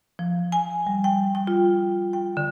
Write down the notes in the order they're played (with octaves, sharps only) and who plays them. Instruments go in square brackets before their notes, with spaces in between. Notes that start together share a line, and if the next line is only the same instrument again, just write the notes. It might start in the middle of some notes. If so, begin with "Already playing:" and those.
[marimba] F3
G#5
G3
G5
G5
F4
G5
D3